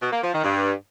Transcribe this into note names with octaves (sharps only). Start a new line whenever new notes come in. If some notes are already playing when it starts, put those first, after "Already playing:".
B2
A#3
F3
D#3
G2